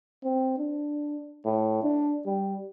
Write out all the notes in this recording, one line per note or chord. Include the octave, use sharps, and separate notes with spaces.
C4
D4
A2
D4
G3